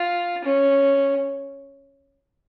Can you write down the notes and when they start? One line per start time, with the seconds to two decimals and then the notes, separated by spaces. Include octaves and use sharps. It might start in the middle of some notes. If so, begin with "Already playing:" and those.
Already playing: F4
0.44 C#4